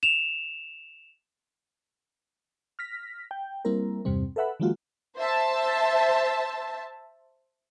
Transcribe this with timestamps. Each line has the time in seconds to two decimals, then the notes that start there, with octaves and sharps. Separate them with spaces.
0.03 E7 F7
2.79 F6 A#6 B6
3.31 G5
3.65 G3 A#3 C4 E4 A#4
4.05 E2 G2 C3 G3 C4
4.36 A4 B4 E5 F#5 B5
4.60 D#3 F3 G#3 A#3 F4 F#4
5.17 C5 E5 A5